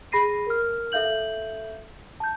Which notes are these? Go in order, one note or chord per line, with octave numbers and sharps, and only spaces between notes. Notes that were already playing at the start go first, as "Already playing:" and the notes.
G#4 B5 A#6 C7 D#7
A#4 F6
A4 E5 F5 G6 F#7
A5 G6